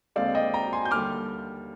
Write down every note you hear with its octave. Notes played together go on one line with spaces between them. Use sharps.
D#2 D3 G#3 C4 D5 F5
D#5 G5
G5 A#5
G#5 C6
G6
D#2 D3 G3 D6 F6